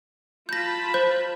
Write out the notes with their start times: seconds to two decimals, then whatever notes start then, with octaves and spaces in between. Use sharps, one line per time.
0.49 F4 A5 B5 G6 A#6
0.94 C5 G6